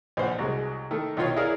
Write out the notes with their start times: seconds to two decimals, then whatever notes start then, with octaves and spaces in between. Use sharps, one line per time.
0.17 A#1 C5 F#5
0.39 C2 F#3 G#3
0.91 D#3 A3 D#4
1.17 B1 D#3 F4 C#5 F5
1.36 E4 G#4 A#4 C#5 D5 F5